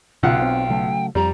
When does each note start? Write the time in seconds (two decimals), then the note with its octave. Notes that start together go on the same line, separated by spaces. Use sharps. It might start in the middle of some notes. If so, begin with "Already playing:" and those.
0.23 B1 C#3 F4 F#5 G5
0.42 C4
0.70 C#3 F#3 A3
1.15 F2 G3 A#5